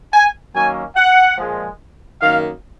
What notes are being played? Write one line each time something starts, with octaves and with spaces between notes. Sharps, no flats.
G#5
D#3 F#3 A#3 C#4 G#5
F#5
A#2 F3 G#3
F#2 D#3 A#3 F5